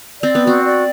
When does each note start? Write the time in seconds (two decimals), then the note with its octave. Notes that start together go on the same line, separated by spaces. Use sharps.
0.22 C4 D5
0.35 B3
0.44 C4 F#4
0.64 D5